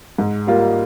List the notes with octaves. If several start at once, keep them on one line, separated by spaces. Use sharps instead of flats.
G#2
G3 A#3 F4